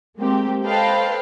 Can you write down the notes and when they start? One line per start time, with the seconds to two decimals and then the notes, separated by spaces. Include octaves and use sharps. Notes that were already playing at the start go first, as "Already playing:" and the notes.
0.17 G#3 A#3 C4 G4
0.65 A4 B4 C5 D#5 F5 G5